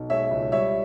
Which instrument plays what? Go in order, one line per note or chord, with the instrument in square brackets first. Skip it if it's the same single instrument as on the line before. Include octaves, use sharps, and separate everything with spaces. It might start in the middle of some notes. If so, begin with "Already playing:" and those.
Already playing: [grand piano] B1
G#3 C#5 E5
C#2
G3 C#5 E5